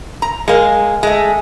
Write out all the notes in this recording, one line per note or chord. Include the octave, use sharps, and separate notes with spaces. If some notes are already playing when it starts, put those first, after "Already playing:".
A#5
G#3 A#3
G#3 A3